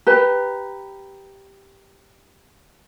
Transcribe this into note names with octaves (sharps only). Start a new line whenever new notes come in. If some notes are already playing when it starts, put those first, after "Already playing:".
G4 B4 A#5